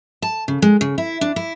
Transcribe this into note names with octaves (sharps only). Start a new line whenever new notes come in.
A5
C#3
G#3
C#3
E4
D4
E4